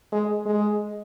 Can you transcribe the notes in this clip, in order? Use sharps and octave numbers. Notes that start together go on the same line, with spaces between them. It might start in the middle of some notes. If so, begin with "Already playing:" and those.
G#3
G#3